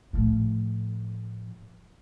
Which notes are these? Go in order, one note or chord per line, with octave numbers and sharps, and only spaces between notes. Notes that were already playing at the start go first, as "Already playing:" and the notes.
A2 F3